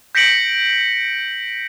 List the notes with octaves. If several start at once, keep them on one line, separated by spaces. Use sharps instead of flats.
G6 A#6 B6 C#7 D7 F#7